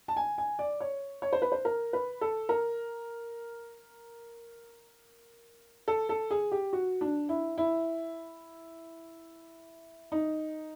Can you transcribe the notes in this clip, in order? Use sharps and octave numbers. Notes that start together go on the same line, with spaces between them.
A5
G#5
G#5
D5
C#5
C#5
C5
B4
C5
A#4
B4
A4
A#4
A4
A4
G#4
G4
F#4
D4
E4
E4
D#4